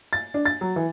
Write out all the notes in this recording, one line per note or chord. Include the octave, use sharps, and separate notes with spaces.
A6
D4
A6
F#3
E3